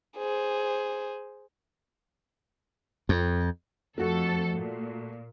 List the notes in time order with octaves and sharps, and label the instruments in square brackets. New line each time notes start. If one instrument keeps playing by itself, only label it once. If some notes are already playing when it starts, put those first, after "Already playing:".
[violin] G#4 C5
[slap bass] F2
[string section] F2 A4 [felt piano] A3 F#4
[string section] A#2